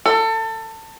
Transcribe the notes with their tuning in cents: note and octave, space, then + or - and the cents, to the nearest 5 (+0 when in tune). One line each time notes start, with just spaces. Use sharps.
A4 +25